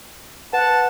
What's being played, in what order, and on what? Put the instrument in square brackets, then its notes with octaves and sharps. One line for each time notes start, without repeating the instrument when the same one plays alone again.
[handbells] B4 [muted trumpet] F#5 [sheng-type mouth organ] A5